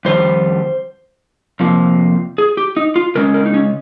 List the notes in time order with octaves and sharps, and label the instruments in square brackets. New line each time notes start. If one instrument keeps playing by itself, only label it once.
[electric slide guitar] F2 D#3 G3 C5
F2 C3 F3 A#3
G#4
G4
D#4
F4
C#3 G#3 C#4 A#4
A#4
D#4
C#4